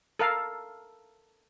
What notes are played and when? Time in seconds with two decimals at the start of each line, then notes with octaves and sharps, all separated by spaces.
0.19 A4 A#4 F5